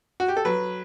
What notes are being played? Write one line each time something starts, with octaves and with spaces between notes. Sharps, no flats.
F#4
G4
A4
F#3 B4